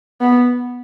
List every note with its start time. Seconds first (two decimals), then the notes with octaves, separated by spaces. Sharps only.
0.21 B3